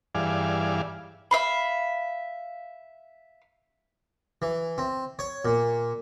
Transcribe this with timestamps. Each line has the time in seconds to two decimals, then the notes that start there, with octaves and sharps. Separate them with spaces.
0.15 G2 E3 G#4 D5 F5
1.31 E5 F5 B5
4.42 E3
4.78 C4
5.19 C#5
5.45 A#2